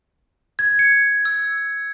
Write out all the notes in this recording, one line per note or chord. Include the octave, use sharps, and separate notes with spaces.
G#6
C#7
E6